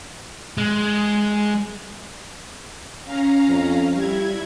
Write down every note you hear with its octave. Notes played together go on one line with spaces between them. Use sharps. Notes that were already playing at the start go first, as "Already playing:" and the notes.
G#3
C#4 F5 A#5
F2
G3 E4 G#6